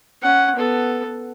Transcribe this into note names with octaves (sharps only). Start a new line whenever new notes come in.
C#4 F#5
B3 A4